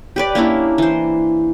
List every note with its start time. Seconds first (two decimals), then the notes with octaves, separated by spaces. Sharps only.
0.16 G4 B4 D5
0.35 A#3 C#4 D4 E4
0.78 E3 C5